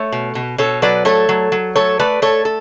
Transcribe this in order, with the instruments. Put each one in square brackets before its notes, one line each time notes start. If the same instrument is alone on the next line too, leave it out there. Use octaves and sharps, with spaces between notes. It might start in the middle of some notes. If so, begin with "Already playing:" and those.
Already playing: [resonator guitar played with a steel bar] A3 A4 C#5
B2
B2
B2 A4 C#5
F#3 B4 D5
A3 A4 C#5
F#3
F#3
A3 A4 C#5
A3 B4 D5
A3 A4 C#5
A4